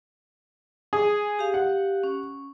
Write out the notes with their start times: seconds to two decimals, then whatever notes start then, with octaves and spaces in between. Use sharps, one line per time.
0.93 G#4
1.39 G4 F5
1.54 F#5
2.04 C#4